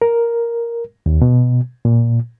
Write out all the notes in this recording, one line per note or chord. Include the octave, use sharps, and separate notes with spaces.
A#4
D#2
B2
A#2